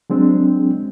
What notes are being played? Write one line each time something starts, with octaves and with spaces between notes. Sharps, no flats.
F#3 G#3 C4 D4